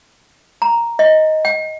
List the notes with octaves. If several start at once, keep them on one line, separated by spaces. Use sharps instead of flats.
A#5
D#5
G5